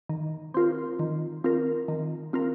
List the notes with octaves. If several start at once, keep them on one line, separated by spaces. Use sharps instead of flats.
D#3
C4 F4 A#4
D#3
C4 F4 A#4
D#3
C4 F4 A#4